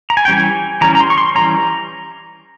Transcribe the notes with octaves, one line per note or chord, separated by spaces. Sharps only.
A#5
G#5
G5
E3 G3 C#4 G#5
E3 G3 C#4 A#5
A#5
C6
C#6
C6
E3 G3 C#4 A#5